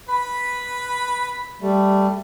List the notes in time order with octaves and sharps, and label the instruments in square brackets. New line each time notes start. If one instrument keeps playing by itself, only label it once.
[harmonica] B4 B5
[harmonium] G3 A3